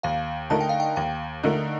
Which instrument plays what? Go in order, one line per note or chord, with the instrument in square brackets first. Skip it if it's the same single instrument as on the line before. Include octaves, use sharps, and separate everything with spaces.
[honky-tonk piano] D#2 [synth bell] F5
[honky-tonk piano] D3 A3 D#4 A#4 [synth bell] A5
[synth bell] G5
F5
G5
[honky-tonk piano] D#2 [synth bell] G5
[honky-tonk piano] D3 A3 D#4 A#4